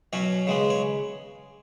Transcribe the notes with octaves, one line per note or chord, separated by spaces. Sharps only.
B2 F#3 C#4 C#5
C#3 G#3 B3
C#5